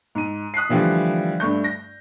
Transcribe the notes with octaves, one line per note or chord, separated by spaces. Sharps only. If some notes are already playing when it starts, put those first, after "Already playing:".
G#2 D#7
D#6 F#6 B6 C7
D3 E3 F3 G3 A3
G2 A3 C#6 G6
A#6